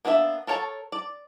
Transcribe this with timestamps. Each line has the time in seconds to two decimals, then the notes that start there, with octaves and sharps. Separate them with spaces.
0.05 A#3 B3 D4 C#5 E5
0.47 A4 A#4 C#5 G5 A5
0.92 D5